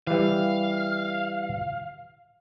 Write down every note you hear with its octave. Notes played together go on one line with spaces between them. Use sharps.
E3 G3 F5